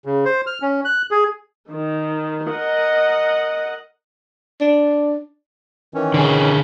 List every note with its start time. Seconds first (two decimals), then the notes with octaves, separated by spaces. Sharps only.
0.05 C#3
0.25 C5
0.47 F6
0.62 C#4
0.85 F#6
1.11 G#4
1.70 D#3
2.50 A#4 D#5 F#5
4.61 D4
5.94 D#3 E3 C#4
6.14 D3 G#4